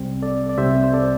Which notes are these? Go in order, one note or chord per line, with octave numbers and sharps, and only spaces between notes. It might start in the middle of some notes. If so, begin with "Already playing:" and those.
Already playing: C2 C3 G3 C4
A4 D5
D5
C2 C3 G3 C4 C5 E5
C5
A4 D5